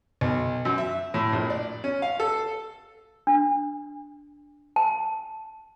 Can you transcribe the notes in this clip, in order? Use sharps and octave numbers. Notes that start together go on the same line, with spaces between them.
B1
F#2
E5
A2
A#1
D5
C#4
F5
A4
D4
A5